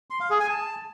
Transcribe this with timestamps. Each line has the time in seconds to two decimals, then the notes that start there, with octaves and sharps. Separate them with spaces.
0.10 C6
0.20 F5
0.30 G#4
0.40 G#5
0.50 A5